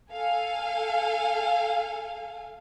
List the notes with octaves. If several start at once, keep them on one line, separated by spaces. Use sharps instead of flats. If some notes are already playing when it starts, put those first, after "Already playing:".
A4 F5 G#5